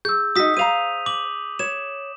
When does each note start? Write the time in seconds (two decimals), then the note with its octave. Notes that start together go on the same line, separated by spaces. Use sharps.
0.05 G#4 E6 G6
0.36 D#4 F#4 D#6 B6
0.57 C5 F5 A#5 D#7 F7
1.06 D6 F#7
1.59 C#5 E7